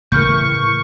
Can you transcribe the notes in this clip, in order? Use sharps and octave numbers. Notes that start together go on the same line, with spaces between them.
A2 C#3 E3 A#4 C#6 F6 G6